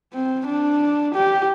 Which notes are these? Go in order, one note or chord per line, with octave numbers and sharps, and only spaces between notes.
C4
D4
G4